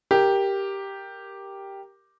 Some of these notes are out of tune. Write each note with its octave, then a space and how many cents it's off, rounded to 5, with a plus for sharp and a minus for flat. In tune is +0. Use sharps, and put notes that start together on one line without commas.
G4 +0 A#4 +0